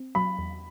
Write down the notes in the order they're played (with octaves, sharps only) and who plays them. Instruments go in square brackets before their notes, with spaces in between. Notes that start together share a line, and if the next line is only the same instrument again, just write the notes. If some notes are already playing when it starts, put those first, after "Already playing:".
Already playing: [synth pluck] C4
[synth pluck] F#3 [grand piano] B5
[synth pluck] E2